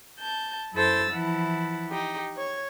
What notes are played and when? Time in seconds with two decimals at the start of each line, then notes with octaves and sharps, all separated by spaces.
0.19 A5 G6
0.73 F#2 E4 A4 C5 E6 A6
1.11 E3 F3 E4 F#5 A5
1.90 D#4 G4
2.37 C#5 G#6